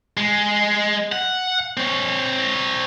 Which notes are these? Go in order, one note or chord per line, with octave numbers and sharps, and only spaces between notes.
G#3
F#5
C4 C#5